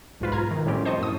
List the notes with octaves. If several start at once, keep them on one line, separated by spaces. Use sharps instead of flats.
B1 G#2 F4 B4
A#5 F6 G#6
D#3
A2 F3 G3 C4 C#4 G4
C5 D#5 A5 C#6
F#2 A2 D#6